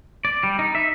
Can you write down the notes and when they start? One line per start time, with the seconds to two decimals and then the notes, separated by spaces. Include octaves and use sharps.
0.25 D5
0.43 G3
0.59 D#4
0.75 E5